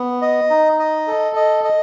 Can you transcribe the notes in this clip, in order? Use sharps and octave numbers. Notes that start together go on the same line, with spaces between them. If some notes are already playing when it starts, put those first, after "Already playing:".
Already playing: B3
D#5
D#4
D#5
A4
D#5
D#5